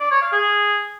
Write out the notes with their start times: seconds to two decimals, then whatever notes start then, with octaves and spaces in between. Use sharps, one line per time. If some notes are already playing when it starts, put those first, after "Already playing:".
0.01 D5
0.11 C#5
0.22 F5
0.33 G#4